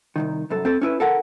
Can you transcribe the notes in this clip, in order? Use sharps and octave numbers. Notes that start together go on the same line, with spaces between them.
C2 F2 D#3
C2 F#2 A4
C4 A4
C#4 E4 B4
A4 A#4 F#5